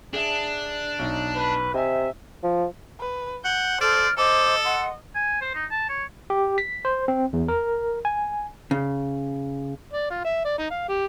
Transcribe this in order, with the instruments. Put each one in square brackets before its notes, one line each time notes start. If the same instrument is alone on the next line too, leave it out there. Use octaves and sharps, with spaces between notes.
[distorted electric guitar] D4 [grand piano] G#4 E5
[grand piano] B1 D#4
[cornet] B4
[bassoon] C3 [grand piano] D#5 G#5 [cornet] E5
[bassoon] F3
[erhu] B4
[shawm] F#5 [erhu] G6
[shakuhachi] A4 [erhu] C5 [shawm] D5 [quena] F6
[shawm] A4 [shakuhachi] C5 [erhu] D#5 [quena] D6
[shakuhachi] F#5 [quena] C6
[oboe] G#5
C5
D#4
A5
C#5
[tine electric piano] G4
B6
C5
C4
E2
A#4
G#5
[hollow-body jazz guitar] C#3
[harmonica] D5
F4
E5
D5
D#4
F5
G4